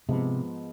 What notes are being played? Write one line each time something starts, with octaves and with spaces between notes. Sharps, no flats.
G#2 C3 F3 B3